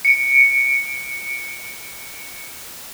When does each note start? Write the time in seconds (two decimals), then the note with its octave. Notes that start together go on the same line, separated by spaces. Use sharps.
0.05 C#7 D7